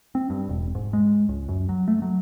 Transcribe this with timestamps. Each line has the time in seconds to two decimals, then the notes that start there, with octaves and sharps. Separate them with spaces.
0.15 C4
0.30 G2
0.49 E1
0.75 G#2
0.93 G#3
1.29 C#2
1.49 F#2
1.69 F#3
1.88 A3
2.02 F#3